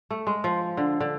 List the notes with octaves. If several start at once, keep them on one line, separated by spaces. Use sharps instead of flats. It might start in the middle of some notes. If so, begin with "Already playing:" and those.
A3
G#3
F3
D3
D3